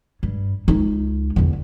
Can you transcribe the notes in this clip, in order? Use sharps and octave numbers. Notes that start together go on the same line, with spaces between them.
G2
C#2 D#4
E2 D3